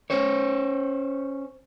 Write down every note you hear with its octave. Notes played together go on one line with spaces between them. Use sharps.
C#4 C5 C#5